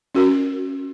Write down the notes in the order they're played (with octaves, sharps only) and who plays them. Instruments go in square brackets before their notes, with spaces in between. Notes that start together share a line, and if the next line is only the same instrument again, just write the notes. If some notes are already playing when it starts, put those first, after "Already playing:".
[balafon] C#4 F#4 A#4